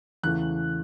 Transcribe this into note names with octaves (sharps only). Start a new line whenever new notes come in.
E2 C#3 E3 A3 F#6